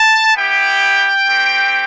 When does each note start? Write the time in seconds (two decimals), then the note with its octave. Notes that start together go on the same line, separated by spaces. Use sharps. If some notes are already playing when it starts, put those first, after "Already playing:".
Already playing: A5
0.36 B3 E4 G4 G5
1.28 A3 C4 G4